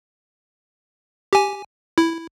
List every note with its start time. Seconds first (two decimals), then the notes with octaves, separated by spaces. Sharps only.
1.33 G4 G#5
1.98 E4